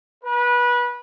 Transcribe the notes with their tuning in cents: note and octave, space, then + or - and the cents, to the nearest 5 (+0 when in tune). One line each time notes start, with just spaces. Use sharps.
B4 -25